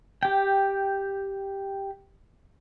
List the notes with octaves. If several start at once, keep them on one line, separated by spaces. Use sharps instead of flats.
G4 G5